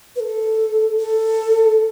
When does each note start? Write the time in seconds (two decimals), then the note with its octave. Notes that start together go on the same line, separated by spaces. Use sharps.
0.16 B4
0.20 A4
0.98 A4